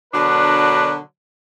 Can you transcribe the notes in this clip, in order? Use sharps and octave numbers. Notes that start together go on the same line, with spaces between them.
B2 D3 F#3 D4 A#4 B4